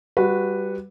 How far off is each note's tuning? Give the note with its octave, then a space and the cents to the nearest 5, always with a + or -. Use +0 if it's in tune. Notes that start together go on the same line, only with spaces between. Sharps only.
G3 +0 F#4 -20 B4 +0